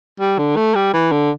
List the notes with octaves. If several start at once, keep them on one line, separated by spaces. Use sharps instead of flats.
G3
D3
A3
G3
E3
D3